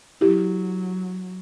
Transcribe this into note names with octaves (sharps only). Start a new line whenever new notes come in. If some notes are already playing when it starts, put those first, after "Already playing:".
F#3 E4 G4